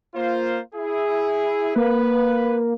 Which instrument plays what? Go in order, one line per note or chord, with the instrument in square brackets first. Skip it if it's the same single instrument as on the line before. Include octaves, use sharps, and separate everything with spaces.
[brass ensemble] A#3 F4 C5
E4 G#4
[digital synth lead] A#3 [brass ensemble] B4